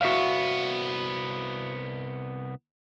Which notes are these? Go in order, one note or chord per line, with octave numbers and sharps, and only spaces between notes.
C2 B3 F#4 E5 F5